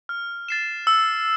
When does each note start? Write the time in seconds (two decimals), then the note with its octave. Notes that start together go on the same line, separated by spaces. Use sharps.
0.09 F6
0.49 A6 C7 E7
0.87 E6